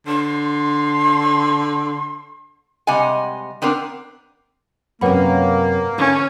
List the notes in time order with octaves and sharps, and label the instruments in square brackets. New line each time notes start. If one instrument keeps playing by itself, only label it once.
[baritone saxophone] D3 [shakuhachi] C6
[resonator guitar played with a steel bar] C3 G3 G#3 D#5 F#5 G#5
B3 C4 D4 A#4
[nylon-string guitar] F#2 C3 C#4 [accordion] A#3 [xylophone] B4 F#5 B5
[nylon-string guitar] D3 [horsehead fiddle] C#4